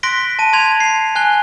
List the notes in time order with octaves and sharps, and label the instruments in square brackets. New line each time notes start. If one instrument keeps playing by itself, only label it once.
[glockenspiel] C6 F#6 A#6 B6 D7 G7
A5 D#7
A5 C6 G#6 F7
C7
G#5 F#6 G7